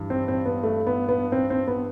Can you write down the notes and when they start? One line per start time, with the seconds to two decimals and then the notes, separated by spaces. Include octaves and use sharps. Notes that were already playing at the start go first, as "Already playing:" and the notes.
Already playing: G2 E3
0.10 C4
0.28 C4
0.46 B3
0.64 A3
0.87 B3
1.09 B3
1.32 C4
1.50 C4
1.67 B3